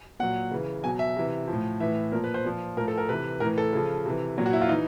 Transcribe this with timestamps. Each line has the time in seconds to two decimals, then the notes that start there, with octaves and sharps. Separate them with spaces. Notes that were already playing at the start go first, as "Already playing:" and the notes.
0.20 A#2 F#3 F#5
0.51 C#3 E3
0.83 B2 F#3 G#5
0.99 E5
1.16 C3 E3
1.48 F3
1.53 A2
1.80 A2 E3 E5
2.12 A#2 F3 A#4
2.24 B4
2.34 C5
2.45 A#2 F3
2.77 A2 F3 A#4
2.88 A4
2.97 A#4
3.09 C3 E3 B4
3.40 A2 E3 A#4
3.58 A4
3.73 C#3 F3
4.05 C3 E3
4.38 A#2 F#3
4.46 F#4
4.53 E4
4.62 F4
4.69 E3 D#4